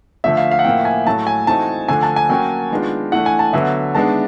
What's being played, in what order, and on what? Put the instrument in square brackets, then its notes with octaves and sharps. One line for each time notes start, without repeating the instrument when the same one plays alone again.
[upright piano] D3 F3 A3 [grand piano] E5
[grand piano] F5
F5
F#5
[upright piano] A2 F3 A#3 [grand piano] G5
[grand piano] G#5
[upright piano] A2 F#3 A3 [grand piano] A5
[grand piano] G#5
[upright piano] E3 A3 C4 D#4 F#4 [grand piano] A5
[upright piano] D3 F3 A3 D4 [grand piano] G#5
[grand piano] A5
G#5
[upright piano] F#3 A#3 C#4 F#4 [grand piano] G5
[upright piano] D#3 G#3 B3 D4 F4
[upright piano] E3 A3 D4 [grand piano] F#5
[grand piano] G#5
A5
[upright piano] D3 F#3 B3 [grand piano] E5
[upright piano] D#3 G#3 B3 D4 [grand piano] A5